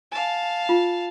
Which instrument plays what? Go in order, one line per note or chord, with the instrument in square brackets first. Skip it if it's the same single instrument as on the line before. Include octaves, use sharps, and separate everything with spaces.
[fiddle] F5 A5 [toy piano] G#5
[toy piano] F4